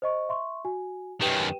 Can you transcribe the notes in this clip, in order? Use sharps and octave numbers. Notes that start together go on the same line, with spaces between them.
C5 D#5 C#6
E5 C6 C#6
F#4 G#5
F#2 D#3 G4 B4 G5